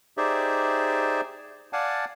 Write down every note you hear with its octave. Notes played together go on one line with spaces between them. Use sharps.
D#4 G4 G#4 C5 D5 E5
D5 F5 F#5 G#5 A5